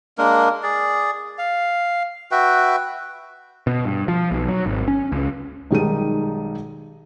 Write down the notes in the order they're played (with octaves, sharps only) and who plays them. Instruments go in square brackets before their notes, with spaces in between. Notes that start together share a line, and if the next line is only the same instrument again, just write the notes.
[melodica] G#3 A#3 D4 A#4
G#4 D5
F5
F#4 B4 E5 G5
[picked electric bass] B2
G2
F3
B1
F#3
G#1
C#4
C#2
[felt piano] B1 D#3 G3 G#3 D#4 D#7